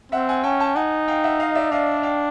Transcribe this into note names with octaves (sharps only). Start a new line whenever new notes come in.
C4 E5 F#5
F#5 G#5
C#4 G5 A5
G5 A5
D#4 F#5 G#5
F5 G5
E5 F#5
D#5 F5
D#5
D5 E5
D4 D#5 F5
F5 G5